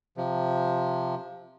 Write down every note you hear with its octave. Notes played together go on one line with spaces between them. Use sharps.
C3 F3